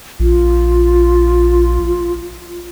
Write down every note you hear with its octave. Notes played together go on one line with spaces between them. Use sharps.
A#1 F4